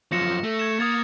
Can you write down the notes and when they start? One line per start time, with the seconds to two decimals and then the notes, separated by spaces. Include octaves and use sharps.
0.12 F#2 F3 A#6 C#7 E7
0.44 A3
0.59 G#6 A#6 E7
0.80 A#3 D#6 G#6 A6